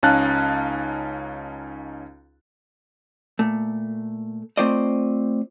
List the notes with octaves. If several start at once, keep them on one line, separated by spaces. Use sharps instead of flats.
C#2 C#4 D#4 F5 A5 F#6
A#2 A3
A3 C4 F4 C5 D5 D#5